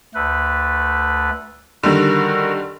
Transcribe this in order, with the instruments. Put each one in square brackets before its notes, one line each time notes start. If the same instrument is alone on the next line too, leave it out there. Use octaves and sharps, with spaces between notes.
[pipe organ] D2 A3 B4
[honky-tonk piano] D3 D#3 G3 [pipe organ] F#4 A#4